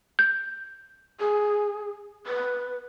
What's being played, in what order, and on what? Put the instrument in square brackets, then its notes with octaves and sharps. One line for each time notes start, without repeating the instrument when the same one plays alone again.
[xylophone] G6
[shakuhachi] G#4
B4